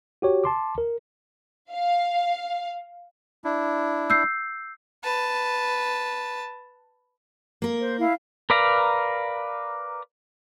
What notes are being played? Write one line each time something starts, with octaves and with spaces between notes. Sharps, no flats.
F#4 G4 C#5
A5 C6 D6
A#4
F5
D4 E4
E6 G6 C7
B4 A5
A#3 A#4
C5
E4 F5
A#4 B4 D5 F5 A#5